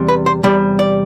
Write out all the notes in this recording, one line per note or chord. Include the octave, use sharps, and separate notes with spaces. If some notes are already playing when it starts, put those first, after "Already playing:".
Already playing: E2 C3 G3
B4
C5
E2 C3 G3 D5
D5